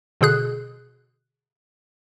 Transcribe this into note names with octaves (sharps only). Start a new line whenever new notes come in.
B2 D3 G#4 F#6